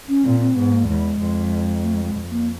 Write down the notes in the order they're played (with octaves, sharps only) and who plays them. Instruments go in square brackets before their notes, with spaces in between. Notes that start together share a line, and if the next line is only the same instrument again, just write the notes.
[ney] C#4
[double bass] A#2 [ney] C4
[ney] C4
[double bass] G#2 [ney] B3
[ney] A#3
[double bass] E2 [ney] G#3
[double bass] F2
[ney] A3
G#3
G#3
[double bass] F2
[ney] A#3